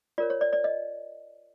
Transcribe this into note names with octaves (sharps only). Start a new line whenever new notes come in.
F4 A#4 C#5 D5
C#5
D5
D5
D#5